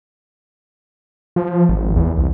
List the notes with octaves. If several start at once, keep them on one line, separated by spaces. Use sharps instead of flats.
F3
G#1
E2
C2